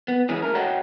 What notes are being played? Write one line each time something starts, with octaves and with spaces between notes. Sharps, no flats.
B3
E3 G#3 C#4 G#4
A3 A#4
F#4 A4 C#5 D#5 F#5 G5